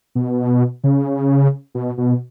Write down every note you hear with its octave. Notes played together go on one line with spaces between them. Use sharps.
B2
C#3
B2
B2